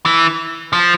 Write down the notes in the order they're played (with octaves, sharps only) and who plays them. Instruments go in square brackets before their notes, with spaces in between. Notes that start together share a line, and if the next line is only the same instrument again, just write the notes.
[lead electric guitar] E3
F3